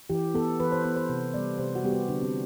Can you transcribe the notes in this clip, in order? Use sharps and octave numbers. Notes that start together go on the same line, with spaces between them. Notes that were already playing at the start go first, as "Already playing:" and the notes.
E3 G4
B3 A4
E3 B4
C5
B3 C5
C5
C3
G3 B3 D5
C3 C5
F#4
G3 B3 G4
F#4
D3 D4
C4